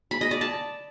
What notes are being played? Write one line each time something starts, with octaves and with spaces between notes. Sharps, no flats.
B5
D#5
D5
A5